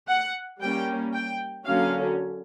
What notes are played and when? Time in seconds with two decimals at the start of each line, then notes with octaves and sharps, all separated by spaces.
0.09 F#5
0.61 G3 A#3 C#4 G5
1.13 G5
1.66 D3 F#3 A#3 C#4 F5